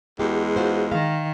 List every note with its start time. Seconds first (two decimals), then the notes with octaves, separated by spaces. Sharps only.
0.19 E2 G#3 F#4 G4
0.56 F4 F#4 C5
0.92 D#3 F5